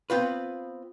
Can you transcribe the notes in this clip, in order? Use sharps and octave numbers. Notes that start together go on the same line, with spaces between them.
B3 C4 F4 B4